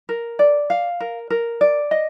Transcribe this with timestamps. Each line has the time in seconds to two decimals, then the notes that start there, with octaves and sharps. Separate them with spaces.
0.09 A#4
0.39 D5
0.70 F5
1.00 A#4
1.30 A#4
1.61 D5
1.91 D#5